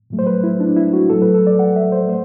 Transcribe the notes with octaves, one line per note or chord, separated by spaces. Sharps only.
A2 F#3 A3
C5
B4
E4
D4
E4
F#4
A2 F#3 A3 A4
B4
A4
D5
F#5
E5
C5
A3 C5